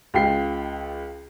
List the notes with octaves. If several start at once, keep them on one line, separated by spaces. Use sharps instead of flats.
C#2 F4 G5 C7